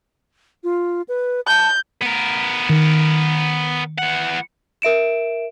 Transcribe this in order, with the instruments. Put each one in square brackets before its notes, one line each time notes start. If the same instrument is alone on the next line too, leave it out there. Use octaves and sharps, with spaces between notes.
[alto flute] F4
B4
[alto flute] A5 [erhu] G6
[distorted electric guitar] B3 A#4
[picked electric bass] D#3
[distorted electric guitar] E3 F#5
[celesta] A#4 E5 D7 E7